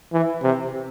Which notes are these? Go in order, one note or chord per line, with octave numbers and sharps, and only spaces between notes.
E3
C3